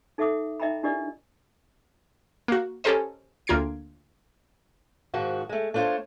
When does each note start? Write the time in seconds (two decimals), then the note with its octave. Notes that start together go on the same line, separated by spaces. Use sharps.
0.18 D#4 A4 E5 F#5 D6 D#6
0.60 D#4 D#5 E5 G5 A#5 B5
0.83 D4 E4 G4 A#4 D5 D#5
2.48 A#3 F#4
2.84 C#4 G4 A4 A#4 C5 D#5
3.47 D2 A#3 F4 G#6 C7 D7
5.14 G#2 D#3 F3 F#4
5.49 G#3 A3
5.74 A3 D4 F4 C5 C#5